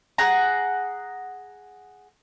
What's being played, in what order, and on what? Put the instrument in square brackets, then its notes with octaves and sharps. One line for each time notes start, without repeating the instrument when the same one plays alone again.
[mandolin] G#4 F#5 A#5